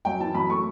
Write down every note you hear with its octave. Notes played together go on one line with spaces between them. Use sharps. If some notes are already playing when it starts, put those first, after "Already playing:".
F#2 G5
E3 A5
F#2 B5
A3 C#6